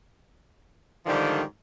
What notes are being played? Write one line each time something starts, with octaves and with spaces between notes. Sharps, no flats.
G#2 D3 D#3 F3 G3